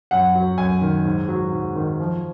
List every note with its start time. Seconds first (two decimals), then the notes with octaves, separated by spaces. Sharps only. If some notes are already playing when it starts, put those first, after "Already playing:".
0.11 F#2 F#5
0.35 F#3
0.58 F#2 G#5
0.81 D#3
1.05 G#2
1.29 F#3
1.52 G#2
1.76 D#3
2.00 F3